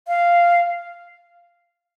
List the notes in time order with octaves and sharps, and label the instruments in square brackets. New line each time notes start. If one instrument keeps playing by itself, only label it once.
[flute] F5